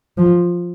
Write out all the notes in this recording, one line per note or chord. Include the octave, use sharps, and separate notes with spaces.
F3